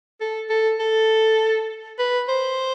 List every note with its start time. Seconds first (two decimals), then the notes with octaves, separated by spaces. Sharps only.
0.21 A4
0.50 A4
0.79 A4
1.99 B4
2.28 C5